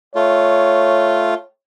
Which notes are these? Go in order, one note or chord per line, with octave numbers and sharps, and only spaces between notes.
A3 F4 C#5